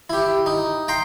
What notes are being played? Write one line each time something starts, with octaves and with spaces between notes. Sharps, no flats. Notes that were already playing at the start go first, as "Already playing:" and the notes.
E4 G4
D#4
G5 A#5 C6